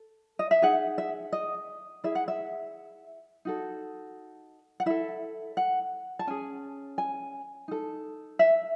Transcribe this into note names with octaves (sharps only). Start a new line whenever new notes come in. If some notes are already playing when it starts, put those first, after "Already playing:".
Already playing: A4
D#5
E5
D#4 G#4 F#5
E5
D#5
E4 G#4 E5
F#5
E5
D#4 F#4 A4
F#5
E4 A4 E5
F#5
A5
C#4 G#4 G#5
G#5
D#4 A4
E5